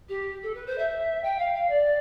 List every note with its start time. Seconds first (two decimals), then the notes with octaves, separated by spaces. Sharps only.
0.08 G4
0.43 A4
0.54 B4
0.66 C5
0.78 E5
1.23 G5
1.38 F5
1.54 F5
1.69 D5